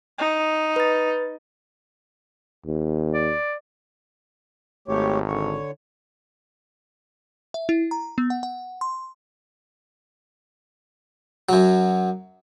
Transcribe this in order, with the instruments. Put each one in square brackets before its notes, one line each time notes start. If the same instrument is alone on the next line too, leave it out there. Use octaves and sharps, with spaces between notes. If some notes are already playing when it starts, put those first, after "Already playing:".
[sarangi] D#4
[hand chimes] B4 A6
[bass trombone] D#2
[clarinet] D5
[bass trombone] G#1 [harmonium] A3 G4 C#5
[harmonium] D3 C#5
[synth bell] E5
E4
A#5
B3
F#5
F#5
C6
[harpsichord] F#2 F#3